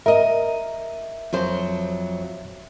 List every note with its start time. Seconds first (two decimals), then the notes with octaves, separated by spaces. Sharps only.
0.06 A#4 D#5 E5
1.33 F2 F#3 C5